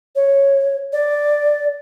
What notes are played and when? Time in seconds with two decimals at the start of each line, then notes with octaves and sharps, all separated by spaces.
0.16 C#5
0.93 D5